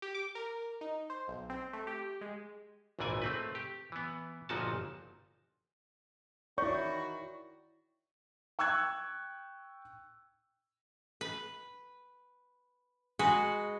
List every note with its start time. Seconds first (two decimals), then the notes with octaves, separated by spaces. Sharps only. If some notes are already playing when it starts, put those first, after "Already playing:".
0.02 G4
0.15 D6
0.35 A#4
0.81 D#4
1.10 C5
1.28 B1
1.50 C4
1.73 A3
1.87 G4
2.21 G#3
2.99 G#1 C#2 A#2 E3 D5 G#5
3.22 A3 C4 B4
3.55 G4
3.92 E3 B3
4.49 G1 A#2 F3 D#4 F#4 A5
6.58 D#3 E4 F#4 C#5 D5 C#6
8.59 G5 C#6 E6 F#6 G#6
11.21 B4
13.19 G#3 F#4 B4